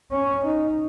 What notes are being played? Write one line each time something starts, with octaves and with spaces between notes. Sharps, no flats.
C#4
D#4